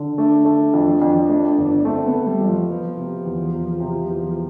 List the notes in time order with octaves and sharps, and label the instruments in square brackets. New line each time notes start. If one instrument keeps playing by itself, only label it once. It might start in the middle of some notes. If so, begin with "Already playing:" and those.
Already playing: [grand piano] D3
[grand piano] A3 [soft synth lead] D4
[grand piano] A3
F2
F2
A3
G1
[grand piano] A3 [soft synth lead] C4
[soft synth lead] B3
[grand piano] A3
[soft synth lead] G3
[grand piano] F2
[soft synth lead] F3
[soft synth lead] F3 [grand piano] B3
[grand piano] C3
E2
E2
C3
E2